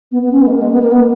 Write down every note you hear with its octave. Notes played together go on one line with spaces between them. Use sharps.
B3
B3
C#4
B3
G#3
A#3
G#3
B3
A#3
B3